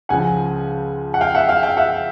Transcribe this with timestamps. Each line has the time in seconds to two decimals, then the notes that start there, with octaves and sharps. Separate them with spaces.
0.09 C#2 C#3 F3 F#5 G#5
1.14 F#5
1.21 F5 G5
1.35 E5 F#5
1.49 F5 G5
1.63 F5 G5
1.77 E5 F#5